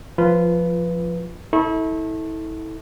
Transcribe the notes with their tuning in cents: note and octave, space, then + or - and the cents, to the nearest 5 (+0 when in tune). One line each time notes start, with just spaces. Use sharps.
F3 +0 F4 -20 B4 +0
E4 -35 A4 +0 C#6 -30